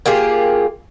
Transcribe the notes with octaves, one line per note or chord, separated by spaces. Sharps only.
A#3 F4 G4 G#4